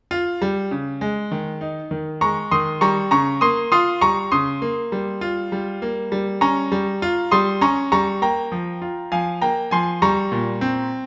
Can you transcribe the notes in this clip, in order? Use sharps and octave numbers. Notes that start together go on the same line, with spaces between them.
F4
G3
C#3
G#3
D#3
D#4
D#3
G#3 A#5 C#6
D#3 C6 D#6
G3 A#5 C#6
C#3 A#5 C#6
A#3 C6 D#6
F4 C6 D#6
G3 A#5 C#6
C#3 C6 D#6
A#3
G3
F4
G3
A#3
G3
C#4 A#5 C#6
G3
F4
G3 C6 D#6
C#4 A#5 C#6
G3 A#5 C#6
A#3 G5 A#5
F3
F4
F3 F5 G#5
A#3 G5 A#5
F3 G#5 C6
G3 A#5 C#6
A#2
C4